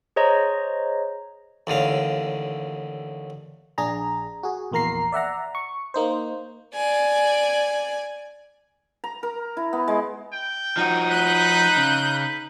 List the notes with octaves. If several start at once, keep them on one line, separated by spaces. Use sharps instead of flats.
G#4 C5 C#5 D#5 A#5 A#6
A1 D#2 D3 F5
A#1 D4 G#4 A#5
F#4 G#4
A#1 E2 A#3 A#4 A#5 C7
D5 E5 F#5 A#5
C#6
A#3 D#4 C5
D5 G#5
A#5
A#4
E4
B3
G#3
G5
F3 D#4 F#4
B4 F#6 G6
C#3
B4